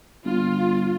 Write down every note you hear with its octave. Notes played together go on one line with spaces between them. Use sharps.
G1 F4